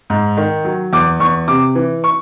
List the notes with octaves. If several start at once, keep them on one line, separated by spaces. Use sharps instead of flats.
G#2
D#3
F#3
E2 D6
E2 C#6
C3 D6
E3
C#6